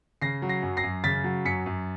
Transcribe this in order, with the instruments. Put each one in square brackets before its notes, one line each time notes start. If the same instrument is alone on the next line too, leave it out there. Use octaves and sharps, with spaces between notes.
[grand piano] C#3 A#6 C7
F#3
A#6 C7
F#2
A#6 C7
F#2
C#3 A6 B6
F#3
F#2 B6 C#7
F#2